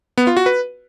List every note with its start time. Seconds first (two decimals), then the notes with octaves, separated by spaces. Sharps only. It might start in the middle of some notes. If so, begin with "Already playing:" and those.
0.18 B3
0.27 F4
0.37 F#4
0.46 B4